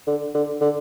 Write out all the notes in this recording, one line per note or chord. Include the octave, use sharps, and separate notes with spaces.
D3
D3
D3